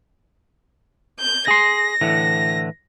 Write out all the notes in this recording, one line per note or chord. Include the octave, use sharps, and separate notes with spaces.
G6
G#4 C6 A#6
A2 D3 E3